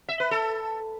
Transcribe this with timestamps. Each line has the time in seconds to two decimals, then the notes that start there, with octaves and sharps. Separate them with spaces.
0.08 E5
0.20 B4
0.31 A4